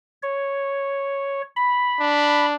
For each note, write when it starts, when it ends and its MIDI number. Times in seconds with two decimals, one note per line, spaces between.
0.23 1.42 73
1.56 2.46 83
2.00 2.55 62